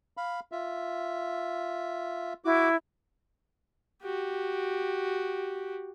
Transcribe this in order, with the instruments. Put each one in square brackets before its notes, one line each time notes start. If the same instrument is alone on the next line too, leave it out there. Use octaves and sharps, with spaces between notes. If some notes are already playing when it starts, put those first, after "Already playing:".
[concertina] F5 B5
F4 E5
[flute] E4 [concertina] F#4 D6
[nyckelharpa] F#4 G4